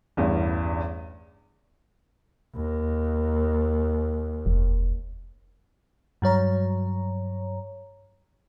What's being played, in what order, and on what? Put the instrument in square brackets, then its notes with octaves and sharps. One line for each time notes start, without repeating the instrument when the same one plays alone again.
[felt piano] A1 E2 G2
[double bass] D#2
[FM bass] F1
[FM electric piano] G2 F#3 C#5 A#5